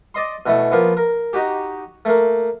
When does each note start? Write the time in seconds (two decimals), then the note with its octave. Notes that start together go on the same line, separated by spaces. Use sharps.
0.15 D5 D#5 C6
0.46 B2 E3 A3
0.72 F3 A#3 B3
0.97 A#4
1.33 D#4 F#4 G4
2.05 A3 A#3